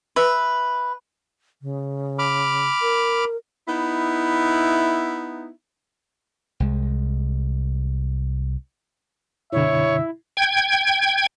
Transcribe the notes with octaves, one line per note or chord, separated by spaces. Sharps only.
B4 E5
C#3
B5 D6 F6
A#4
B3 D#4 E4
C2 G#3
F#2 B2 D3 E4 C#5 E5
G5 G#6